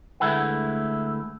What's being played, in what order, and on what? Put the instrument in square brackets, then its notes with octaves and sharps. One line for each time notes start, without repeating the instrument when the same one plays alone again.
[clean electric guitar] D2 G#3 A3 E4 B4 F#5